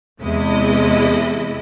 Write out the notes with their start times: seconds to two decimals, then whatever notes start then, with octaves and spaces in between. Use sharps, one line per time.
0.20 E2 C3 G#3 E4 D#5